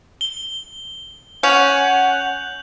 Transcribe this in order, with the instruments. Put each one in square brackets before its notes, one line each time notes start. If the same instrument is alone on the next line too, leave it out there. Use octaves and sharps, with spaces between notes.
[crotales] G7
[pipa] C#4 [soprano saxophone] F#5 [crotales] G6 F7 F#7